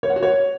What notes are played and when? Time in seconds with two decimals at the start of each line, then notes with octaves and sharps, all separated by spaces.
0.03 C#5
0.10 F#5
0.16 F#4
0.23 C#5